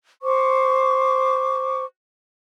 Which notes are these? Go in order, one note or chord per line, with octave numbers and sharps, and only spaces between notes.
C5 C#6 D6